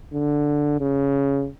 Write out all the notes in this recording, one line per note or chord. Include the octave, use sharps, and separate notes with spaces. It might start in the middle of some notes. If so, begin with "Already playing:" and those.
D3
C#3